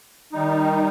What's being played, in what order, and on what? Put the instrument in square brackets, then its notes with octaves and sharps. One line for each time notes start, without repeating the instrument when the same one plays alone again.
[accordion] D#3 G3 D#4